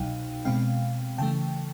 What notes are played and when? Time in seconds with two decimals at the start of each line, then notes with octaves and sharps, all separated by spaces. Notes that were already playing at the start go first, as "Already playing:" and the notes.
Already playing: C2 B2 F#3 D#4 F5 G5
0.45 B2 G#3 C4 F5 G5
1.18 C#3 E3 A3 G5 A5